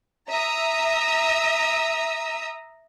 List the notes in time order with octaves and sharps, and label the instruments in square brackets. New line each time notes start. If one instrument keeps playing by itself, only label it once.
[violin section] E5 A#5 D#6 E6